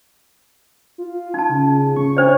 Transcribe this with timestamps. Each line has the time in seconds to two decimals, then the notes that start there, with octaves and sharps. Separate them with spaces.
0.98 F4
1.34 D#4 A5
1.49 C#3
1.96 C#6
2.17 D4 C5 C#5